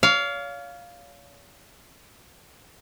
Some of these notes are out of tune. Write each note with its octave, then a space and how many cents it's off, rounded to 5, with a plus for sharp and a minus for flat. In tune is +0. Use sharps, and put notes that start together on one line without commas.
C#5 +40 F5 +0